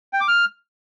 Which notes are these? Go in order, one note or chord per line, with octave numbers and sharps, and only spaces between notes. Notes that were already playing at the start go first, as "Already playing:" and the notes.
G5
D6
F6